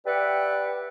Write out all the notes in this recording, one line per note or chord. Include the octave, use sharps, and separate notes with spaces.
G4 B4 D5 E5 F#5 G5